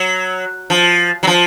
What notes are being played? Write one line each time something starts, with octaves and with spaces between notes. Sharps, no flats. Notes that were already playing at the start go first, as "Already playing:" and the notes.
Already playing: F#3
F3
F#3
F3